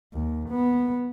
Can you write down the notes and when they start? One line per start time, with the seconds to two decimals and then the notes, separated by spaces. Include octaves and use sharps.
0.14 D#2
0.49 B3